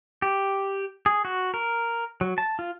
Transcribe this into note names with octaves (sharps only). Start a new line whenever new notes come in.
G4
G#4
F#4
A#4
F#3
A5
F4